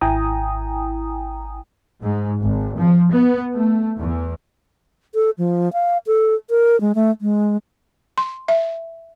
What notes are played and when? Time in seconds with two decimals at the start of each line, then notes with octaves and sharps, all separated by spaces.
0.01 G#1 E4 G5 G#5 A#5 D#6
2.02 G#2
2.42 G#1
2.77 F3
3.11 B3
3.56 A3
3.98 E2
5.15 A4
5.38 F3
5.73 F5
6.07 A4
6.50 A#4
6.81 G#3
6.95 A3
7.21 G#3
8.18 C6
8.48 E5